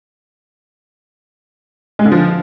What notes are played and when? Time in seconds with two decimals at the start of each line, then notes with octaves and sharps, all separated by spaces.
1.99 G#3
2.05 D3
2.12 F3